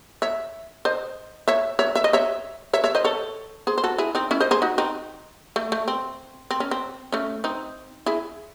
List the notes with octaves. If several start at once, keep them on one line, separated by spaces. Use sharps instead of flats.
C#5 E5
C5 D#5
C#5 E5
C#5 E5
E5
D#5
C#5 E5
C#5 E5
C#5 E5
C5 D#5
A4 C#5
G#4 C5
C5
F#4 A4
E4 G#4
C4 D#4
C#4 E4
C5 D#5
G#4 C5
D#4 F#4
C4 D#4
A3
A3
C4
C4
C#4
C4
A3 C#4
C4 D#4
E4 G#4